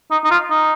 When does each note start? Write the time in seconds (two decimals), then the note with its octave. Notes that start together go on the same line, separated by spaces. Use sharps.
0.11 D#4
0.25 D#4
0.31 F4
0.51 D#4